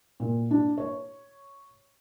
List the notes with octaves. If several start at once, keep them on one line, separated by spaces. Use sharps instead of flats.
A#2
D4
C#5